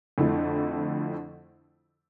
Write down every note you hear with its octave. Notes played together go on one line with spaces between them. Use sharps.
F2 D3 A3 E4 A4